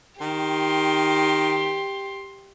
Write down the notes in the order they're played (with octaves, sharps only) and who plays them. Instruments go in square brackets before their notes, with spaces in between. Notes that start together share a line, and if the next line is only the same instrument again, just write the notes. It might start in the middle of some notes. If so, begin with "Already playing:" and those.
[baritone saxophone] D#3 [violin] G4 C6